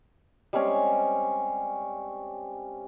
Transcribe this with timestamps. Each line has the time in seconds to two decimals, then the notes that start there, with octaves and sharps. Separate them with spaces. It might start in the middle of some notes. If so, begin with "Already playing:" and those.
0.53 G3 G#3 C4 C#4